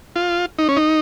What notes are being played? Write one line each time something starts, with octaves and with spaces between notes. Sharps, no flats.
F4
D#4
C#4
D#4